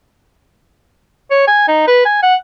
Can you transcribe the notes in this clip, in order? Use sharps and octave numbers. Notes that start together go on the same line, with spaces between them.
C#5
G#5
D#4
B4
G#5
F#5